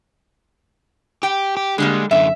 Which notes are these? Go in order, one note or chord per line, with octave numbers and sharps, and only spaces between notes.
G4 G5
G4
D3 G3 G#3 A#3
F#2 D3 E5